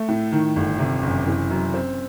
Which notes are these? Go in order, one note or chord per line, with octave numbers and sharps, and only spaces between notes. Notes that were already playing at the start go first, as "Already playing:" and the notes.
Already playing: A3
A2
D#3
G1
C3
F#1
E3
F#2
C4